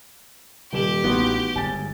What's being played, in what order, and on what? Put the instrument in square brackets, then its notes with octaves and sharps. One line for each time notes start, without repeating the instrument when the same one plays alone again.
[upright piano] D#1 E7 F#7 [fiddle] G4
[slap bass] A1 E3 [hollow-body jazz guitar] B3 [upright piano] D#4 F#4 C6
[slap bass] G1 G#2 [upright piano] G#5 A6